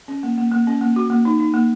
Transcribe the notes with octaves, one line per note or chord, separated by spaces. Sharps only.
C#4
A#3
A#3
A#3
C#4
A#3
F#4
A#3
D#4
D#4
A#3